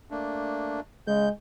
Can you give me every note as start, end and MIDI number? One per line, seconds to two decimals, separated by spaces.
0.11 0.80 57
0.11 0.80 58
0.11 0.80 62
1.07 1.29 49
1.07 1.29 56
1.07 1.29 91